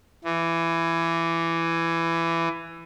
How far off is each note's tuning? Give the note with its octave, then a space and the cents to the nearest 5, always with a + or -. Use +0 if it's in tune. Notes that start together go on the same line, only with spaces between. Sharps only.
E3 +15